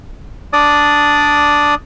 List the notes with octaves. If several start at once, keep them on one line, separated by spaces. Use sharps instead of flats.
D4 D5 D#6